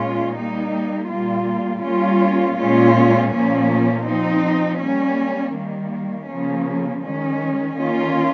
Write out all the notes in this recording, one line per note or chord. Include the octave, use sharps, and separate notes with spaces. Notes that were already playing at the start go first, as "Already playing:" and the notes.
Already playing: A#2 G#3 C#4 F4
G3 A#3 D#4
A#2 G3 A#3 F4
G3 A#3 C#4 F4
A#2 G#3 C#4 F4
A#2 F3 A#3 C#4
F3 C4 D#4
G3 A#3 C#4
D#3 G3 A#3
C#3 F3 A#3 C#4
D#3 G#3 C#4
D#3 A#3 C#4 F4